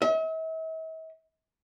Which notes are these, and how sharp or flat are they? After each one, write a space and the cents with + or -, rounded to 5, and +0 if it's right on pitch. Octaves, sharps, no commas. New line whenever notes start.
E5 -45